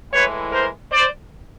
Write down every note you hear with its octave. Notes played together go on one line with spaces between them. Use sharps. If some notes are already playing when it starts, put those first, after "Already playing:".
A2 E3 G#3 B4 C#5
A#4 C5
C5 D5